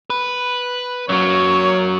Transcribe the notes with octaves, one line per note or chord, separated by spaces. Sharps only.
B4
F#2 F#3 A#3 C#5